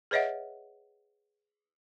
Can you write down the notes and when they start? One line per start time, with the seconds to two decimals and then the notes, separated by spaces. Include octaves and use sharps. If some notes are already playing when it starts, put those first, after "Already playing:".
0.11 G#4 B4 C#5 D#5 E5 F#5